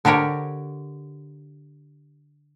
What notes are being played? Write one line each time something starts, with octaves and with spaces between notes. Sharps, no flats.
D3 D4 G4 A#4 C#5